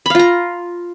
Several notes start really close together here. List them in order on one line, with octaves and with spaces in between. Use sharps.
B5 F5 F4 A#5